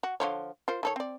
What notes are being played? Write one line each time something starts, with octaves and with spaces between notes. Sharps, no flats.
F#4
D3 F3 C#5
F4 A#4 C5
D#3 A4 C#5
C4 D5